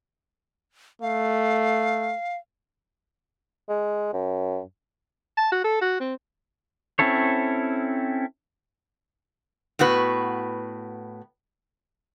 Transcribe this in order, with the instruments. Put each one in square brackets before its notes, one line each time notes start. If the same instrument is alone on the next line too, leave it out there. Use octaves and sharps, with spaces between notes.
[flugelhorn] A3 [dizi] F5
[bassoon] G#3
F#2
[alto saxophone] A5
F#4
A4
F#4
C4
[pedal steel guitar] C4 C#4 E4 A4 C#5
[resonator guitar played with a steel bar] A2 B3 F#4 B4